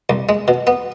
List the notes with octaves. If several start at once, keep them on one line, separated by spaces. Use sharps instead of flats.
C2
G#3
B2
B3